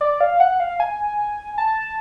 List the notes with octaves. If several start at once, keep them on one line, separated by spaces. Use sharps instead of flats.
D5
F5
F#5
F5
G#5
A5